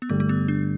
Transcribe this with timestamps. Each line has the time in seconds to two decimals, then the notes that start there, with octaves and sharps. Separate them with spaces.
0.02 B3
0.09 G1 G2 D3 G3 A3
0.20 A3
0.29 B3
0.48 D4